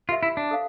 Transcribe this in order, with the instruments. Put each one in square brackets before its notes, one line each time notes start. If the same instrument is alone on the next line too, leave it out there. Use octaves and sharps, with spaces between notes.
[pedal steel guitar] F4 [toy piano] G4 A#4 E5
[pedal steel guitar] E4
D4
[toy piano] A4 C5 F5